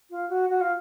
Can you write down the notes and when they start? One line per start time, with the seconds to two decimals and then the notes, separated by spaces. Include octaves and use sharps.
0.10 F4
0.29 F#4
0.49 F#4
0.61 F4